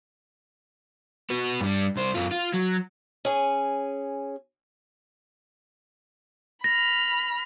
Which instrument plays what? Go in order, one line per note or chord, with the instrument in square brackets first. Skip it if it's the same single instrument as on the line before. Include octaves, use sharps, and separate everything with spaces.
[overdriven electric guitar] B3 F#4
G2 G3
C2 C5
F#2 F4
F4
F#3
[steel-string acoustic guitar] C#4 G#4 G#5
[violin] B5 F6 [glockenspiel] A#6